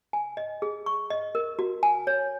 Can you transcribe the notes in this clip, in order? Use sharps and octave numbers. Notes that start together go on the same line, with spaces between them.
G#5
D#5
G#4
C#6
D#5
A#4
F#4
G#5
C#5